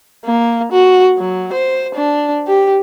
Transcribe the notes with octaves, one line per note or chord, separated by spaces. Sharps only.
A#3
F#4
F#3
C5
D4
G4